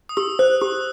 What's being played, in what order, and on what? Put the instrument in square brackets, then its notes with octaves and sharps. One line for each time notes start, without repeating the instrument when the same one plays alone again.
[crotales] D#6
[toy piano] G4 [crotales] E6
[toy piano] C5 [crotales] F#6
[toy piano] G4 [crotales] D#6